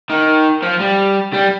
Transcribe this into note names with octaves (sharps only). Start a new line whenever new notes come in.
D#3
F3
G3
G3